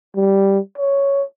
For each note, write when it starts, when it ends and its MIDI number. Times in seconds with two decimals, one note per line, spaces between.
0.16 0.59 55
0.78 1.23 73